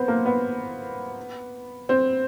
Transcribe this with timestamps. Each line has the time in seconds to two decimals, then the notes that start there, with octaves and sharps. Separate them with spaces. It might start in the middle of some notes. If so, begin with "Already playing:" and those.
Already playing: B3 C4
0.08 A#3
0.26 B3
1.89 C4